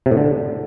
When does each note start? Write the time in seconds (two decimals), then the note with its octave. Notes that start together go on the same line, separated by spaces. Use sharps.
0.06 C3
0.11 A2
0.17 D3